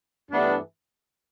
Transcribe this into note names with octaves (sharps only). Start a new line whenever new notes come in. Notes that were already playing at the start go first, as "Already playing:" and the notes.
G2 E3 A3 B3 D4